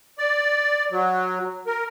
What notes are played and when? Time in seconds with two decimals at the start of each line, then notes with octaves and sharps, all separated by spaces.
0.18 D5
0.92 F#3
1.67 A#4